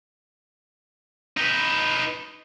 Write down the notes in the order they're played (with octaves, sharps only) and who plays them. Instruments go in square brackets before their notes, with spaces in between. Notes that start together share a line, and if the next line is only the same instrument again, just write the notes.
[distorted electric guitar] D#4 B4